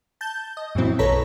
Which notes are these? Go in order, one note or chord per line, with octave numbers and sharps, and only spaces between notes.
A5 G6
D#5
F#2 A#2 E3 F#3 C4 E4
B1 A4 B4 C#5 A#5 B6